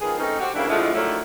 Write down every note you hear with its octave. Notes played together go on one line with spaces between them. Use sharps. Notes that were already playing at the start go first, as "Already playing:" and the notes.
D#3 F3 B3 G#4
A3 C4 C#4 D#4
C4 F#4 G4
D2 C#3 G3 A#3 D4 E4
F2 D3 G#3 A3 E4 F4
D3 D#3 F3 F#3 A3 E4